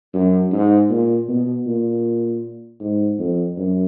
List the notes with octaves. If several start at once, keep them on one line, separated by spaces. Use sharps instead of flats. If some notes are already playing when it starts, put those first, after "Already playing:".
F#2
G#2
A#2
B2
A#2
G#2
F2
F#2